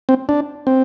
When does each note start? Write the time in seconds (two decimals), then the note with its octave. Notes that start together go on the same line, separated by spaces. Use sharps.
0.09 C4
0.29 D4
0.67 C4